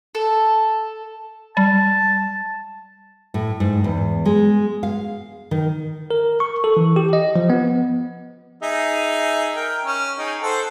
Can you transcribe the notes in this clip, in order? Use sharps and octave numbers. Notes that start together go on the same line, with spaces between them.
A4
G3 A5
A2
G#2
E2
G#3
F5
D#3
A#4
C#6
A4
E3
G4
D#5
F3
B3
D#4 G#4 E5
A#4 G5
C#4
D#4 G#4 G5
A4 C5 F#5